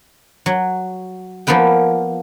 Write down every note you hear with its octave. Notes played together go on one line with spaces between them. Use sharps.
F#3
F3 A#3 B3 B4 G5